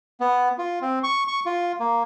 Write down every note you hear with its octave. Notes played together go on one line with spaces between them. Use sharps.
B3
F4
C4
C#6
C#6
F4
A#3